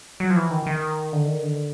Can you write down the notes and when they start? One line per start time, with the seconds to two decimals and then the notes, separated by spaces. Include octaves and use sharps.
0.20 F#3
0.30 F3
0.36 E3
0.51 D#3
0.66 D#3
1.12 D3
1.28 D#3
1.43 D3